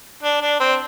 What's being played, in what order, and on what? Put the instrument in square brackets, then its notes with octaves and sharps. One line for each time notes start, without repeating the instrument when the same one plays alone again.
[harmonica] D4
D4
C4